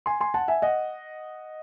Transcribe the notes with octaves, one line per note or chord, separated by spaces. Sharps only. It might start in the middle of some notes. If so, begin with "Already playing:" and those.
G#5 C6
G#5 C6
F#5 A5
E5 G#5
D#5 F#5